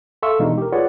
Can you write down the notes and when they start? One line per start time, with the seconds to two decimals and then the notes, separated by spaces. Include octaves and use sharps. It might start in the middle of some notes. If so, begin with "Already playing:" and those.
0.23 A4 E5 F5 C6 C#6 E6
0.39 B2 E3 G#3 D4 D#4
0.58 G4 A#4
0.72 F4 G#4 B4 C#5 D5 F#5